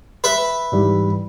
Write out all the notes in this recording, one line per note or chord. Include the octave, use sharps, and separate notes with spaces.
B4 E5
G#2 E3 G3